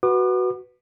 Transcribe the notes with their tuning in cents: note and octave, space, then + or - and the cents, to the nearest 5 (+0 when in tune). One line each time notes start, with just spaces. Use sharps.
F#4 +5 B4 +0 D6 +45